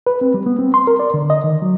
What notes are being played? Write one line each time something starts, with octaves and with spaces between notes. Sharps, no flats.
B4
C4
G3
B3
C4
C6
A#4
D5
D3
D#5
D#3
F#3